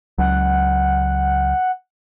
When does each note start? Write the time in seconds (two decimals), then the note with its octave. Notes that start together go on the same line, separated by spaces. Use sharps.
0.18 C#2 F#3 F#5